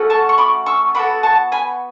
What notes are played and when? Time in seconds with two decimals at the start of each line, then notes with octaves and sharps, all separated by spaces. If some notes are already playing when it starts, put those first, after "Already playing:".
Already playing: A3 C#4 F#4 A4
0.10 A5 C#6
0.29 C#6
0.38 B5 D6
0.66 C#6 E6
0.95 B3 F#4 A4 B5 D6
1.23 A5 C#6
1.52 G#5 B5